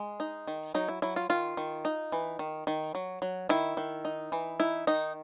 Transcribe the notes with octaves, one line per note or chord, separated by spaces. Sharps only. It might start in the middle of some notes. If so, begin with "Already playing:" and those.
Already playing: G#3
D#4
D#3
F#3 D#4
E4
F#3 E4
F4
D#3 F4
D#3
D#4
E3
D#3
D#3
F#3
F#3
D#3 E4
D#3
D#4
E3
D#4 E4
D#3 D#4